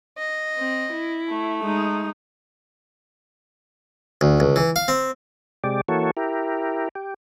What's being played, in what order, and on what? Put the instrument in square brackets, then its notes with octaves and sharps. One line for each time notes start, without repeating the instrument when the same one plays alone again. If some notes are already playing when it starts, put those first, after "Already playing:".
[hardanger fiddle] D#5
[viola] C4
E4
[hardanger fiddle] A3
[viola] G#3 D#4
[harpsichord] D2
C#2
E3
F5
C4
[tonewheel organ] C3 G#3 G4 D5
E3 A#3 F#4 A4 C#5
E4 G4 A#4
G4